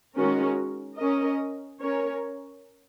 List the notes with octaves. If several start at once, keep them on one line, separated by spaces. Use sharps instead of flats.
D#3 G#3 C#4 F#4 A#4
C#4 A#4 D#5
C#4 A#4 C#5